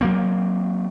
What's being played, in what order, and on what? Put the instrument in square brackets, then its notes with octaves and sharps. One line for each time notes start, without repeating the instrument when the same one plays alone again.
[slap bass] F#3 A#3 C4